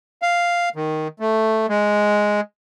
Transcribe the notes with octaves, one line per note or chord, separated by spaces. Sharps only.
F5
D#3
A3
G#3